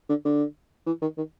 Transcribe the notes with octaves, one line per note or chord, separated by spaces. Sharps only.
D3
D3
E3
D#3
D#3